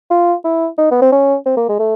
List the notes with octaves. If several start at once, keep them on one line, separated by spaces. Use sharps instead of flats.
F4
E4
D#4
B3
C4
C#4
C4
A#3
G#3
A3